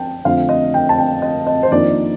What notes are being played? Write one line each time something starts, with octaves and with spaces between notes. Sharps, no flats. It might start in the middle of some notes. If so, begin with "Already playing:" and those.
Already playing: F3 G5 A5
F2 D3 A3 C4 F5
D#5
G5
A5
G5
D#5
D#5
C5
F2 D#3 A#3 D4 D5